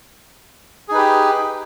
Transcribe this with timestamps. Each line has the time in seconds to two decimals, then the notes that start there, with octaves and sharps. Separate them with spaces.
0.88 G#4
0.91 D#4
0.94 B4
0.97 G4